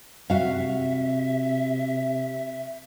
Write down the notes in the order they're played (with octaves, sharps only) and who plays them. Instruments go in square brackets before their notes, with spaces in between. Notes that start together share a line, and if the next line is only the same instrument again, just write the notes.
[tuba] C3 [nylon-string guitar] F#4 F5 [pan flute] E5